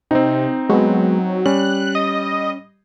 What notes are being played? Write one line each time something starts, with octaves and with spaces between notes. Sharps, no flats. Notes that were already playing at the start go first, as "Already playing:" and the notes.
C3 C4 D#4
F#3 G#3 B3
G3 C#4 F#6
D#5